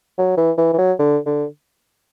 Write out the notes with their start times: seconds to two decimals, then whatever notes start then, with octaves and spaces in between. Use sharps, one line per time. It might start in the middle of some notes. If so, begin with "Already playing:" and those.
0.18 F#3
0.37 E3
0.58 E3
0.73 E3
0.78 F#3
0.99 D3
1.26 D3